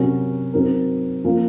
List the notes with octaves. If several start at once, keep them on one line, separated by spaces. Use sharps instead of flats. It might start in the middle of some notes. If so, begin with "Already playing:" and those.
Already playing: C3 F#3 C#4 F#4 A#4
F#3 C4 D#4 A#4
F3 A#3 F4 A#4